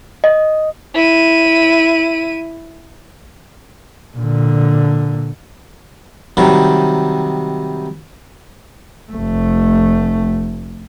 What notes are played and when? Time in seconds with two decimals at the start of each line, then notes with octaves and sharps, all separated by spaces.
0.24 D#5
0.94 E4 D#7
4.17 A#2 D3
6.37 C3 D#3 F#3 G3
9.12 F1 A3